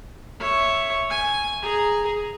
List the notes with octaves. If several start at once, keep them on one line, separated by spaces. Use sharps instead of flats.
C#5 E5
G#5
G#4 A#5